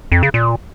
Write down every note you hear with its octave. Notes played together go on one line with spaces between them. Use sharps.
F2
C#3
A#2